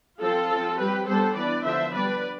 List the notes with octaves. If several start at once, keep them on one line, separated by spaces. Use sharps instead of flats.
F3 C4 F4 A4
F3 C4
G3 C4 G4 B4
G3 B3 D4 A4 C5
E3 B3 D4 B4 D5
D3 F3 B3 D4 C5 E5
G3 B3 D4 B4 D5